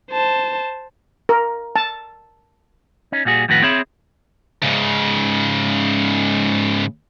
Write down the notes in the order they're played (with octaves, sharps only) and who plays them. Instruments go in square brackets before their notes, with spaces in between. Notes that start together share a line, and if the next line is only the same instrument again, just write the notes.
[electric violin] C5 A5
[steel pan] A#4
A5
[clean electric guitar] C#4 D#4
A#2 G3 F#4 G#4
F2 A2 D#3 F#4 B4 F#5
C4 G#4 C#5 E5 B5
[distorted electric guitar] G#2 C#3